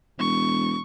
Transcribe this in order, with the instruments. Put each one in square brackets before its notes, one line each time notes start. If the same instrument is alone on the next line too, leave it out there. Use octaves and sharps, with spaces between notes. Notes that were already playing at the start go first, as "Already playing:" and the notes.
[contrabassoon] E1 [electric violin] C#6